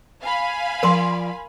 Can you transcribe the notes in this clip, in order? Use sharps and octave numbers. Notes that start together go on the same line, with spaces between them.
F5 G#5 B5
F3 A#4 D5 C6